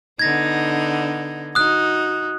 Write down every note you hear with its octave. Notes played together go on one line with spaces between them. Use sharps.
D3 B3 D#4 G#6 A#6
D#4 F#4 D#6 F#6